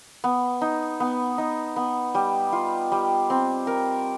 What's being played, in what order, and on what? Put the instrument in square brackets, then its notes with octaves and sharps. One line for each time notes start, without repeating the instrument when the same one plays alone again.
[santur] B3
D#4
B3
D#4
B3
G3
F4
G3
C4
A#4